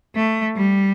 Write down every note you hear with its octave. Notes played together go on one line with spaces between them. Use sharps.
A3
G3